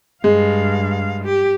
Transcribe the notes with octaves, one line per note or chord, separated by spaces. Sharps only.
G2 G#3 F5
G4